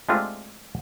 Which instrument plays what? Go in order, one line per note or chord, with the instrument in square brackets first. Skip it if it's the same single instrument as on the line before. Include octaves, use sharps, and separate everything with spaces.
[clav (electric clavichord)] G#3 A3 C4 D4 F4 G4